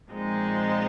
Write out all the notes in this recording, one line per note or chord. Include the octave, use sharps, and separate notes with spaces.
A#2 F3 G#3 C4 D#4